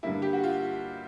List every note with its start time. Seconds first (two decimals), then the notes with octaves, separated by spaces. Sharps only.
0.03 G2 D3 G3 A#3 E4
0.22 G4
0.33 F#4
0.44 F4